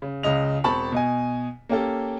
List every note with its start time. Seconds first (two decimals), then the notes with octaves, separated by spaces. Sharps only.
0.02 C#3
0.23 C#2 C#3 D#5 F7
0.64 E1 C4 A5 B5 C#6
0.92 B2 D#5 G#5
1.69 A#3 C#4 G4 A4